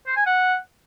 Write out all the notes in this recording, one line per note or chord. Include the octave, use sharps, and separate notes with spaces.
C5
G#5
F#5